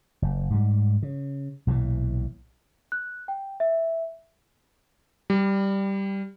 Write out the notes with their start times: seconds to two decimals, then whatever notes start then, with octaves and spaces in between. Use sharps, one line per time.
0.22 F#1
0.50 G#2 G3
1.03 C#3
1.67 B1 A#2 D3 E3
2.92 F#6
3.28 G5
3.60 E5
5.30 G3